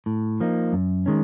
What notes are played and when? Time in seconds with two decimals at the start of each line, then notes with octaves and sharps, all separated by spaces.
0.06 A2
0.40 F3 A#3 D#4
0.73 F#2
1.06 D#3 G#3 C#4